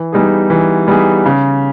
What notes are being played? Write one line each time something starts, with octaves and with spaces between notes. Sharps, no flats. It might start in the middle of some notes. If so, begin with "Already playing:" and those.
Already playing: E3
G3 B3 D#4 G#4
E3
G3 B3 D#4 G#4
C#3